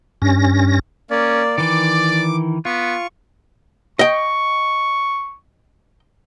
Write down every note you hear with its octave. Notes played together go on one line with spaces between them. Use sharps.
G2 C#4 A#6
A#3 C#4 D5
D#3 E3 D5 D6
B3 F4 C#6
D#5 G5 C#6